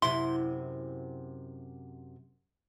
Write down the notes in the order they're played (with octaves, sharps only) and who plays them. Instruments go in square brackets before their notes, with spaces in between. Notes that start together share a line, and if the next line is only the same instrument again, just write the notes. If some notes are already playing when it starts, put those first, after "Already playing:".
[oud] F#2 C3 E4 [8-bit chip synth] C6